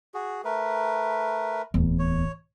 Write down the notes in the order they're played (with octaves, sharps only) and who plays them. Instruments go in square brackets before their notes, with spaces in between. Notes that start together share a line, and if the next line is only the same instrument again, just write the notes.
[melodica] F#4 G#4
A3 A#4 B4
[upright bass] D1 E2
[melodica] C#5